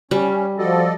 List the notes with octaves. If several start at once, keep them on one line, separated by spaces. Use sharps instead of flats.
G3 C#4
F3 F#4 A4 D5 D#5